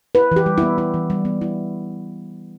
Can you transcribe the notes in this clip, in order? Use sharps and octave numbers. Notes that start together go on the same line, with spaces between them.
E4 B4
E3 G4
G3
B3 E4
E4
E3
G3
B3
E4